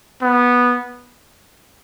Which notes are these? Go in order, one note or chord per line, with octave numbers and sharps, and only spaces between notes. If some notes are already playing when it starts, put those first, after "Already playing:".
B3